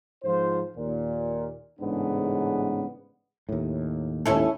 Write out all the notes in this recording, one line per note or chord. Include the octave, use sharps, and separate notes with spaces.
G#2 F3 F4 C5
D#2 A#2
A1 G#2 C#3 B3 D4
D#2 A2
D#2 G#2 C#4 E4 A4